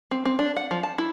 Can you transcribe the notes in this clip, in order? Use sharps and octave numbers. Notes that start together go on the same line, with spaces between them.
C4
C4
D4
F#5
F3
A5
E4